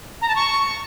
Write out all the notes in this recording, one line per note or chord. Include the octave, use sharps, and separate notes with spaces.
A#5
A5
C#6